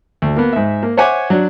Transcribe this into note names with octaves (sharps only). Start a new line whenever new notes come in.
D2
A#3 B3
G#2 E5
A#3
C5 C#5 E5 F#5 G#5 D6
F#3 D4